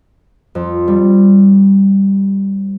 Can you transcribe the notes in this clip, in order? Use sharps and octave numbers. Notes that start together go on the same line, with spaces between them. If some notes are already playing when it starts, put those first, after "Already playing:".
F2
G3